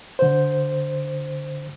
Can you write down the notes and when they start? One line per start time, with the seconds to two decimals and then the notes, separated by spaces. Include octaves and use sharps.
0.19 D3 C5